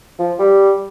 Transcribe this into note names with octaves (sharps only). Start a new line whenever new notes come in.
F3
G3